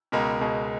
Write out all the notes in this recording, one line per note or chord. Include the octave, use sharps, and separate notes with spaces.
C#2 B2 G#3 A#4
C#2 B2 G#3